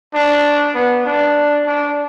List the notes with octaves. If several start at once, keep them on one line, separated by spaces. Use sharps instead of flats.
D4
B3
D4
D4